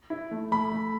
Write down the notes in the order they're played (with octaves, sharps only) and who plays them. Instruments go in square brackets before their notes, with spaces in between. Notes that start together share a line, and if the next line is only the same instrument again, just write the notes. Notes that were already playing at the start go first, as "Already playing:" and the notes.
[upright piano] E4
A3
[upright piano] A3 [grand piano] B5
[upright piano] A3